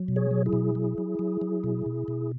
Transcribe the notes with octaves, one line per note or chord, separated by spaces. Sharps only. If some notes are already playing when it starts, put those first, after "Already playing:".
Already playing: F#3
B2
G#4 C#5
F#3
E4 G#4
B2
F#3
F#3
F#3
F#3
B2
B2
B2